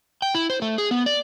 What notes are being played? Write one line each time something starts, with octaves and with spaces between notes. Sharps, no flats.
G5
E4
C5
A3
G#4
B3
D5